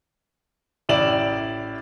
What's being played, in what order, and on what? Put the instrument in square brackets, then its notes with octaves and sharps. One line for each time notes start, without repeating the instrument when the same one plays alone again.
[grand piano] A1 E4 D5 E7 F#7